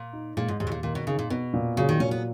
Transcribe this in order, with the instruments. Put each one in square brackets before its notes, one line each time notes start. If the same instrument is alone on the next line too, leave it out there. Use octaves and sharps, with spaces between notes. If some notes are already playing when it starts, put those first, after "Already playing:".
Already playing: [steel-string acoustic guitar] A#2
[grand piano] D#4
[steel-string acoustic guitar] A#2 [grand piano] G#3
[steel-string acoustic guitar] G#2
[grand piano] D#2 [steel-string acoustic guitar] G#2
[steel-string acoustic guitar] B2
A#2
[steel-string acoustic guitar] A#2 [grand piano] D#3
[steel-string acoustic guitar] B2
[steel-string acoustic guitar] C#3 [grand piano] D#4
[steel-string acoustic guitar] A#2
[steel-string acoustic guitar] B2 [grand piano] B3
[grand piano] A#2
[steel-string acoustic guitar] C#3 [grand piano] F#3
[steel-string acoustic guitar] D#3
[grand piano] A#2 [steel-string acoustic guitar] C#4
[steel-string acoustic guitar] B3